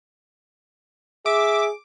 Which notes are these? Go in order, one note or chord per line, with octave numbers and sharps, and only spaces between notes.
G#4 E5 D6